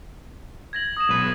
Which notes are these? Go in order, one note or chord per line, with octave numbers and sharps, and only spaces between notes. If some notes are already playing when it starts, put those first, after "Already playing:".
G#6 A#6 F#7
D#6 E7
B1 B4